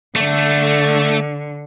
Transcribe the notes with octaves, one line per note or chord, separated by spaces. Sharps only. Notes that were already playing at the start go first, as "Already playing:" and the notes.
D3 A3